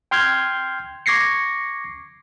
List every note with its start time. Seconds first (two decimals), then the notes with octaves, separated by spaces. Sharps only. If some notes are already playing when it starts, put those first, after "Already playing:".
0.11 G5 C6 F6 G6 G#6
1.06 C#6 D6 G#6 A#6 C7 C#7